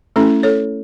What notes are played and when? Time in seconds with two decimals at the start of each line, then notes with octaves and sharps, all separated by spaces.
0.16 A3 C#4 E4 A4
0.43 A4 C#5